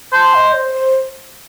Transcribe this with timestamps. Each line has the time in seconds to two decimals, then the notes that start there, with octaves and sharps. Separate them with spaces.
0.13 C5 A5
0.34 D#5
0.55 C5